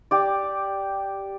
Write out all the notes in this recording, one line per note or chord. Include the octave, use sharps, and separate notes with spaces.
G4 D5